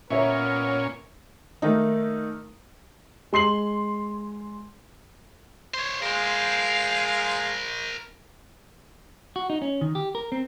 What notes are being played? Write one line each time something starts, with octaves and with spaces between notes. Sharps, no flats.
A#2 B3 C#4 A#4 C#5 E5
D#3 A3 A#3 D#4
G#3 C6 C7 F#7
C5 C#5
G#3 A#4 C5 F5
F#4
D#4
C#4
D#3
G4
A#4
C4